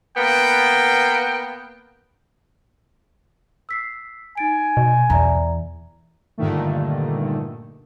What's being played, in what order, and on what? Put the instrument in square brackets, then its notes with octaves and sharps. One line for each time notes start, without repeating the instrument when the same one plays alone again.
[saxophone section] A#3 B3 [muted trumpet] G5
[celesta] E6 B6 C7
[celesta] D#4 A6 D7 [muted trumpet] G#5
[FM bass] B2
[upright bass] E2 E3 [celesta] D5 E5 A#5
[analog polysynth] G2 A#2 D3 D#3 A3